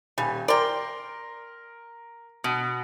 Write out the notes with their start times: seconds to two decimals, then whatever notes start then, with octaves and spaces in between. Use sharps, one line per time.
0.18 D#1 G3 G#5
0.48 A#4 D5 G5 C6
2.44 B2